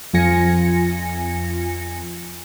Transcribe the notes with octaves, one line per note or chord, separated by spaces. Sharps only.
F2 F3 F4 G#5 A#6 C#7